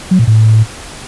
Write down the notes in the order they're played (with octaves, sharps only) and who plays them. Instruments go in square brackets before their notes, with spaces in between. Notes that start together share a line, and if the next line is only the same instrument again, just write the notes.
[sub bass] F#3
A#2
A2